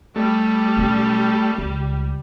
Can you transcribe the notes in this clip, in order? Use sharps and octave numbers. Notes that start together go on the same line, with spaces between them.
G3 A3
B1 C#4
C#2